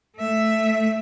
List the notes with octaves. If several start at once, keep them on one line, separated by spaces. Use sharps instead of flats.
A3 E5